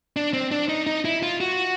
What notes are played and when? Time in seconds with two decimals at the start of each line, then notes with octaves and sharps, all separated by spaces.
0.16 D4
0.33 C4
0.51 D4
0.69 D#4
0.87 D#4
1.05 E4
1.23 F4
1.41 F#4